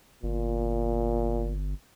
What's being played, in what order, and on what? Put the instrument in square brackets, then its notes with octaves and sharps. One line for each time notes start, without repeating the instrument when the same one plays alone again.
[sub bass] G1 [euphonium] A#2